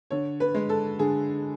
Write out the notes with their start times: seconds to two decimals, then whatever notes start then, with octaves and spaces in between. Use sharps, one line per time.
0.11 D3 C#5
0.40 B4
0.55 G#3
0.69 A4
0.99 D3 G#4